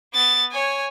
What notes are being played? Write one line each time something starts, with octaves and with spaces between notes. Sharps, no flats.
B3 A6
C#5 G#5